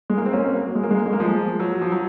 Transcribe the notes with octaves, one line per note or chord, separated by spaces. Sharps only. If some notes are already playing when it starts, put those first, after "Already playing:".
G#3
A#3
C4
A#3 C#4
F#3 A#3
G#3
A#3
G#3
A#3
G#3
A#3
F3 G#3
F#3
F3
F#3